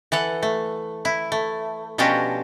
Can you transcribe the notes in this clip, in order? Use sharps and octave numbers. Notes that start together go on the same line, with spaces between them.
E3 A4 F#5
A3
E4
A3
B2 F3 C#4 D4 F#4 G4